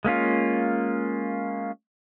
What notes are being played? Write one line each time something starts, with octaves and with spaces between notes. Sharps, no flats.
G#3 A#3 C#4 F4